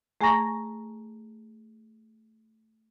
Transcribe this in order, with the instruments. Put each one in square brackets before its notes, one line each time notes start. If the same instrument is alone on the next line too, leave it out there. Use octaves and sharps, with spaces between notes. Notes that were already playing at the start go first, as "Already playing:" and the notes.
[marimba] A3 G#4 G#5 A#5 C#6 A#6